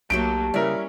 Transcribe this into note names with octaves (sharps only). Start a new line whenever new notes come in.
B1 F#3 A3 A#3 G4 A4 D7
C#3 G3 C#4 E4 A#4 D5